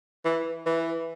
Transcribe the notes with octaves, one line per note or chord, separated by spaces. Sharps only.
E3
E3